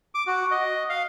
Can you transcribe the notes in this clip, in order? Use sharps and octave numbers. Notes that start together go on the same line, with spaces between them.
D6
F#4
D#5
F5